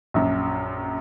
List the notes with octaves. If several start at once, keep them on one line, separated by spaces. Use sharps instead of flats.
A#1 F#2